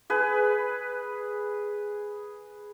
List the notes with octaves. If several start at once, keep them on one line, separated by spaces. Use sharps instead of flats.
G#4 B4